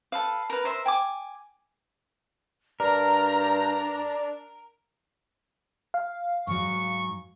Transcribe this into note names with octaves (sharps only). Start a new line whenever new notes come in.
A4 B4 F5
A#4 B4
A#4 C5 E5
G5 G#5 D6
G2 D4 A#4 A#5
F5
G#2 F#3 C#6